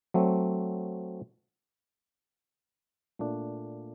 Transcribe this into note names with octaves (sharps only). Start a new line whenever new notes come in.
F#3 A3 C4
A#2 A3 D4